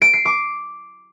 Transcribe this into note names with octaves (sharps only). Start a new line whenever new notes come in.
D7
C7
D6